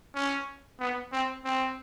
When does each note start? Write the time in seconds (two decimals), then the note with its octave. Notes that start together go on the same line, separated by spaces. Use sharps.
0.15 C#4
0.80 B3
1.12 C4
1.45 C4